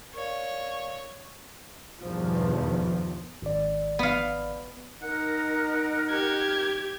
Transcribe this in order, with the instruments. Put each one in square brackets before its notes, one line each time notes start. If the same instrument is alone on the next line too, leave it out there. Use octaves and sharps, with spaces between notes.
[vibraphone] A#4 D5 F5 [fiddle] C#5
[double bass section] E2 G2 B2 D#3 F3
[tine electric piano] G#1 D5
[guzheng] B3 F5
[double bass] D#4 [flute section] A#4 [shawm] F#5
[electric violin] G4 G#6